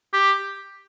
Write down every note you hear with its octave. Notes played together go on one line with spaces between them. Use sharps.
G4